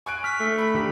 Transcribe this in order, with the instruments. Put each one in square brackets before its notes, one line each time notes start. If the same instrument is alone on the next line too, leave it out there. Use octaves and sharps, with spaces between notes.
[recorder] G#5 [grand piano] C#6 F#6 D7
[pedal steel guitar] F6 [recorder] B6
[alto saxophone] A3
[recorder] B5
[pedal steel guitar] D#3 [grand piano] D4 G4